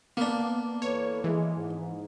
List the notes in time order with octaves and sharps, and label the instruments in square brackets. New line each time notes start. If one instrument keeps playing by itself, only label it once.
[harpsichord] A#3 D4 [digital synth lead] B3
[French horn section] E2 A4 B4 [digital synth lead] C#5
[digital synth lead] E3 [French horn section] G#3
[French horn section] G#2